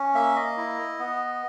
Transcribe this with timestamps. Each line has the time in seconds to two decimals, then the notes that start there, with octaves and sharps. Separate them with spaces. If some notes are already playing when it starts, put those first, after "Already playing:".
Already playing: C#4
0.14 A#3 E5
0.36 D#5
0.57 E4
0.99 B3